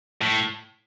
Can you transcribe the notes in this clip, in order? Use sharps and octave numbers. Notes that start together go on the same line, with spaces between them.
A2